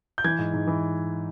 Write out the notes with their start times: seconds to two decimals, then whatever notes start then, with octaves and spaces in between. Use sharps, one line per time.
0.18 G6
0.24 E3 G#6
0.39 G#2
0.53 G#2
0.67 E3